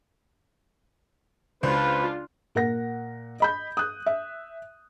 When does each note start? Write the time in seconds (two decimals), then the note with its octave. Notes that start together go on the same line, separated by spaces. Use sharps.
1.63 C#2 D4 F4 B4 C5
2.55 A#2 A#4 F#5 A#6
3.40 D#5 B5 G6
3.77 D#6 F#6
4.06 E5